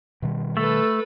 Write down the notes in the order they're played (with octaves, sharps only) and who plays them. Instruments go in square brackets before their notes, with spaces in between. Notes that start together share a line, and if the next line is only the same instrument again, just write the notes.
[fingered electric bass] B2 D#3 G3
[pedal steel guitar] A3 [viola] A4 B4